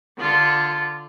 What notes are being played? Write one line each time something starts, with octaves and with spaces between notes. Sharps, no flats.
D3 F4